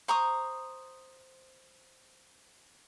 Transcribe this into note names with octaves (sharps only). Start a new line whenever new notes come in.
C5 A#5 C#6 D#6